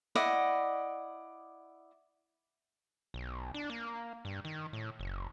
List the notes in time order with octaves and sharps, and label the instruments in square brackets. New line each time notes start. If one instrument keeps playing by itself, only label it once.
[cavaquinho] E4 D5 D#5 F#5
[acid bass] B1
D4
A#3
G2
D#3
A2
F#1